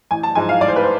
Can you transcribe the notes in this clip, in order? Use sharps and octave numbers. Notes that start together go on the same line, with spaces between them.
A1 G#5
A5
G#2 F3 G#3 G#5
F5
A1 D5
C5
B4
C5